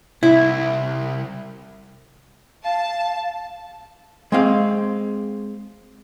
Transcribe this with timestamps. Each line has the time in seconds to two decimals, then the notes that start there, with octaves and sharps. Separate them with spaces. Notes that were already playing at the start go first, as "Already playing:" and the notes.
0.23 C2 E4
2.65 F5 A5
4.32 G#3 C4 F5